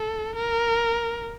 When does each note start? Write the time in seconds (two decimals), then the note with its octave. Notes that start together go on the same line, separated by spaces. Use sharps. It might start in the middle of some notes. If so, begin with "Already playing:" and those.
Already playing: A4
0.36 A#4